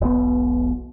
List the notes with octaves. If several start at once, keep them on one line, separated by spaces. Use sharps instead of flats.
E1 B1 B2 B3